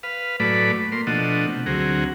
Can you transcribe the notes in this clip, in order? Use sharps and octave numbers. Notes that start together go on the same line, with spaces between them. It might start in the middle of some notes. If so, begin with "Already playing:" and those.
B4 F5
A2 F#3 A3 B4 D5 B5
A#3 C6
B2 F3 A3 D4 D#5 F#5
C3
D2 F#3 C4 G#4 F#5 A#5